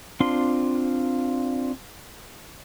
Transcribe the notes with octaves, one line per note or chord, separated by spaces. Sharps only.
C4 D4 F4 C6